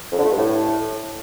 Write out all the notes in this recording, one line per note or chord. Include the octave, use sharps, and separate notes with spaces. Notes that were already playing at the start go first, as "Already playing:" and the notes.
F2
D3
A3
G2
A2